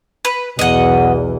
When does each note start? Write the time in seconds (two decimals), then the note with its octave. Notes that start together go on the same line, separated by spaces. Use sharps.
0.25 B4
0.59 B1 E2 D#5 F#5